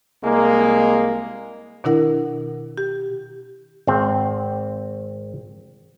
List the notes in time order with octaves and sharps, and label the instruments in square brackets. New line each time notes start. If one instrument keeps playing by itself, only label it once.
[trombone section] C2 G#3 A#3
[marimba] B2 D#3 D4 E4 A#4 F#5
G4
[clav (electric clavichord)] G#1 C4